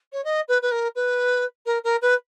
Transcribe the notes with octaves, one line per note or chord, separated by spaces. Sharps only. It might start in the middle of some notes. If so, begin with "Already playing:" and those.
C#5
D#5
B4
B4
A#4
B4
A#4
A#4
B4